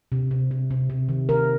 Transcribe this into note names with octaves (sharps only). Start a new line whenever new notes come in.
C3
C3
C3
C3
C3
D#3
D#3 A#4